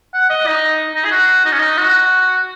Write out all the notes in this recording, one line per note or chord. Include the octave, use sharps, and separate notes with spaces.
F#5
D#5
D#4
D#4
G#4
F#4
D#4
C#4
D#4
F#4